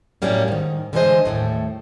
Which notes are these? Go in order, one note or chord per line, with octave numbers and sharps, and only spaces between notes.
F#2 A2 F#3 G3 A#3 C#4
G#2 D#3
D3 E3 G3 G#3 C5 D#5
D#2 A2 A3